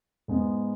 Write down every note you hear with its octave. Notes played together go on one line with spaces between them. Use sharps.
G#2 G#3 B3